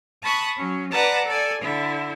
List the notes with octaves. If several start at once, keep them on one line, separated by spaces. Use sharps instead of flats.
A5 B5 C#6 D#6 F#6
F#3 C#4
B4 D5 F#5 A5 A#5
A4 D5 G#5
D3 E4